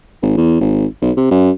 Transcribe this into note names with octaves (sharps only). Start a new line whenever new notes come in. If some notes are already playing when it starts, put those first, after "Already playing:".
G#1
E2
G#1
B1
C3
F#2